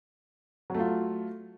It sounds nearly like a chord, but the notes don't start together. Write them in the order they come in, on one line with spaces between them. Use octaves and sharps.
F#3 A3 F4